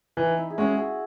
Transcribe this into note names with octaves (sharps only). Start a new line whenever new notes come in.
E3 D#4
E4
G#4
G#3 C#4 F#4
G#4